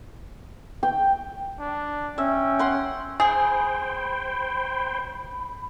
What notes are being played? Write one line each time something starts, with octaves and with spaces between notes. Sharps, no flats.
G5
D4
C#4 E5 G5
F#5 C6
G#4 C5 G5 B5